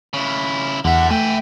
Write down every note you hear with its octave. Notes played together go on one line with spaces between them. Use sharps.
C#3 E4
E2 D3 E5 F#5
A3 E5 G5 G#5